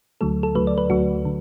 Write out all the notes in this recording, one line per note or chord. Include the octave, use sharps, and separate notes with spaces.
D2 D3 F#3 A3 A4
A4
D2 D3 F#3 A3 B4
D5
B4
D2 D3 F#3 A3 F#4
D3